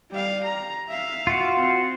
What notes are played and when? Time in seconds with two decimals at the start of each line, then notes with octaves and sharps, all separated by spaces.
0.11 G3 F5
0.43 A#5
0.89 E5 F5
1.27 F4 F#4
1.55 C4